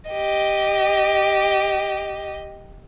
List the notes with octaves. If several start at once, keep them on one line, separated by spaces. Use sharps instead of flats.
G4 D#5